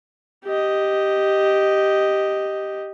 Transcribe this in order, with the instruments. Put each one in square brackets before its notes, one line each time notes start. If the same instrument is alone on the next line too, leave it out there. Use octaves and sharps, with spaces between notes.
[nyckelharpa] G4 D#5